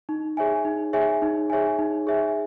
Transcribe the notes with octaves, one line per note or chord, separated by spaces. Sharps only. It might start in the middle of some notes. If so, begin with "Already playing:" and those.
D#4
G#4 C#5 E5 G#5
D#4
G#4 C#5 E5 G#5
D#4
G#4 C#5 E5 G#5
D#4
G#4 C#5 E5 G#5